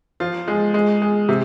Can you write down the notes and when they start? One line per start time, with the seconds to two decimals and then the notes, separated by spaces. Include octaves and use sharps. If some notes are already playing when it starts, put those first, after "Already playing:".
0.20 F3 F4
0.48 G#3
0.74 G#3
1.02 G#3
1.29 C3